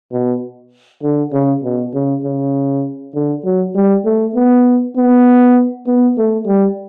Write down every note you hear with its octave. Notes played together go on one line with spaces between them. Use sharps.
B2
D3
C#3
B2
C#3
C#3
D3
F#3
G3
A3
B3
B3
B3
A3
G3